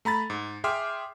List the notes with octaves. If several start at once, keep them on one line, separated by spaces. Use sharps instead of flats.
A3 A#5 B5 A6
G#2
G#4 E5 G5 C6 D6 F6